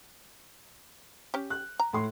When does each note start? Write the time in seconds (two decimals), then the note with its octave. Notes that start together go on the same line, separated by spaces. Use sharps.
1.34 C#4 G4
1.50 F#6
1.80 A#5
1.93 A2 C6